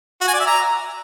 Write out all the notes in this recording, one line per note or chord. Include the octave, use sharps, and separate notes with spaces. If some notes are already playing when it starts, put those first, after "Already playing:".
F#4
G#5
D5
E5
A#5